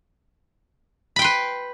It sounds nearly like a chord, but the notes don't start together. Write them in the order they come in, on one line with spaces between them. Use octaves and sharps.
B5 G5 C6 B4